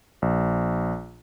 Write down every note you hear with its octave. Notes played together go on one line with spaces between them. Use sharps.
A#1